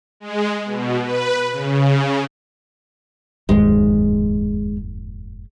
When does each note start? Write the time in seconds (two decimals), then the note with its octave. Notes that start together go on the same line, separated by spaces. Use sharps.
0.20 G#3
0.65 B2
1.02 B4
1.52 C#3
3.49 F1 D#2 G#2 G#3